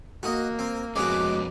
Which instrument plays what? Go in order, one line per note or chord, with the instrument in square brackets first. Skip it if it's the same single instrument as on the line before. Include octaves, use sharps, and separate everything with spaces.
[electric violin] A#3 [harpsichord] F#4 D#5
[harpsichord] C4
[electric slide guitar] F2 B3 C#4 [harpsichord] G#3 F#4 [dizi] D6